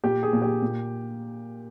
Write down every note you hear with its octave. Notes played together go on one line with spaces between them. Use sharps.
A#2 G4
G#4
A#2
G4
A#2